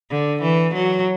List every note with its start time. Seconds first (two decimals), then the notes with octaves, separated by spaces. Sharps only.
0.11 D3
0.42 E3
0.74 F#3